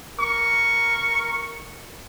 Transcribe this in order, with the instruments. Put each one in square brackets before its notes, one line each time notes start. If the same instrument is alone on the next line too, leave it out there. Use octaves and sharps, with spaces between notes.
[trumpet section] A#4 C#6